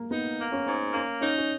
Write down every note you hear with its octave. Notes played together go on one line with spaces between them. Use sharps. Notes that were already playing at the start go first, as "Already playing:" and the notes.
Already playing: A#3
B3 D#4
A#3
C#4
G#2
A#3 C#4
C#4 D#4
C#4